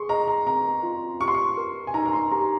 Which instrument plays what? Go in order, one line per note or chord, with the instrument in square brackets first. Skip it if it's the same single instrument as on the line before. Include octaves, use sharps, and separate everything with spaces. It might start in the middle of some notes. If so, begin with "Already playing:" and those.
Already playing: [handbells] G#4 [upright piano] C6 C#6
[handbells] D#5 [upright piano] A#5
[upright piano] A#5
[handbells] C4 [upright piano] A#5
[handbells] F4
[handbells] G4 [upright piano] C#6
[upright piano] C6
C#6
[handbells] A#4
[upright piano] G#5
[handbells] D#4 [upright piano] A#5
[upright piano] A#5
C6
[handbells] G4 [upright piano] A#5